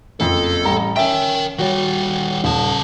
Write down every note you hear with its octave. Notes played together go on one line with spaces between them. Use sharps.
F#1 F2 A4
A1 G3 A#5
C#4 A#4 E5 G5 D7
D#3 G3 F#4 C#5
D#1 C#3 A5